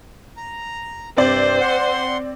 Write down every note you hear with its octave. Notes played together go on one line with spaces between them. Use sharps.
A#5
G2 C3 C4 C5 D5
F#5 C6